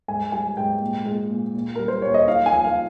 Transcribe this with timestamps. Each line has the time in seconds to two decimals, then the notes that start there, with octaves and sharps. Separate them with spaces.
0.08 G#2 G#5
0.32 G3 G#5
0.57 G#2 G5
0.81 A#2
1.05 G#3
1.30 A#2
1.55 A#2
1.75 G3 A#4
1.88 C5
2.02 A#2 C#5
2.14 D#5
2.27 D#4 F5
2.46 G#5
2.52 F3
2.64 F5